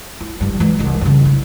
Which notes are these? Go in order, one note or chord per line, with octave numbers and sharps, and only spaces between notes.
E4
G2 E3
E3 G#3
C2 D#4
G2 C#3
E4